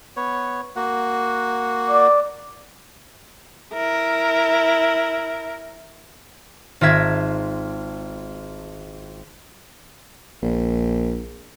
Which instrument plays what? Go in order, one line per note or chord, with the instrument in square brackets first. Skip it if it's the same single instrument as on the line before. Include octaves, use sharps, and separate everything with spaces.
[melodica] B3 C#5
A#3 F#4 F#5
[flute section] D5 D6
[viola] E4 A#4
[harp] G#1 F4 A#4 E5 G#6
[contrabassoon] A#1